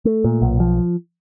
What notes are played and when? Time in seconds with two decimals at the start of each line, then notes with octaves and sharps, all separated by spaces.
0.05 A3
0.24 A#2
0.42 B1
0.60 F3